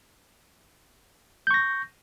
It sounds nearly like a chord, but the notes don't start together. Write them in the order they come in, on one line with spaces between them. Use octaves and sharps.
G6 C#6 A#6